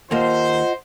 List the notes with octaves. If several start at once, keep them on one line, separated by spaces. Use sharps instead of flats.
D#2 A#3 F4 C5 D#5 F#5